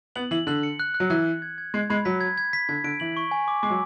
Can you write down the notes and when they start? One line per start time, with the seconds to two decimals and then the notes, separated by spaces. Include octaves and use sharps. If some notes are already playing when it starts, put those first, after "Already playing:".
0.16 B3 F#7
0.31 E3 F#7
0.47 D3 F#7
0.63 C#7
0.80 F#6
0.94 F#6
1.00 F#3
1.10 E3 F#6
1.26 F#6
1.42 G#6
1.58 G#6
1.74 G#3 G#6
1.90 G#3 B5
2.05 F#3 B6
2.21 G#6
2.38 G#6
2.53 B6
2.69 D3 G#6
2.84 D3 D7
3.00 E3 F#7
3.17 C#6
3.31 G#5
3.48 D6
3.63 G#3 D6
3.70 F#3